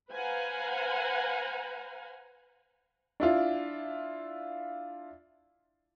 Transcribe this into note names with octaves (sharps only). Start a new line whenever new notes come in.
B4 C5 F5 F#5 G#5 A#5
D4 E4 F4